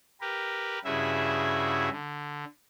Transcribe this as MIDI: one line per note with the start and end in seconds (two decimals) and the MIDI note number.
0.21 0.79 67
0.21 0.79 70
0.21 0.79 71
0.85 1.89 43
0.85 1.89 49
0.85 1.89 64
0.85 1.89 66
0.85 1.89 68
0.85 1.89 76
1.92 2.45 50